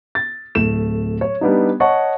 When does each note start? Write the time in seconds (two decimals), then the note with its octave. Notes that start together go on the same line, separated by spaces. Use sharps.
0.15 A6
0.55 D1 A3 E7
1.21 C#5
1.41 G3 B3 D4 D#4
1.80 C#5 D#5 F#5 A5 C#6